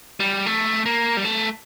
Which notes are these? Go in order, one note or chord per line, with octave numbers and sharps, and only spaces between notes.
G3
A3
A#3
G3
A3